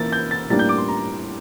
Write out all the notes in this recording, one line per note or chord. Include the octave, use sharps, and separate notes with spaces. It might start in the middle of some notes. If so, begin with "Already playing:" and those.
Already playing: E3 A#3 E4 A6
G6
A6
A2 G3 A#3 D4 A6
G6
D6
C6
A#5